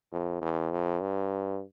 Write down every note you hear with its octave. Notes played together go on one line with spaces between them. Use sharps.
F2
E2
F2
G2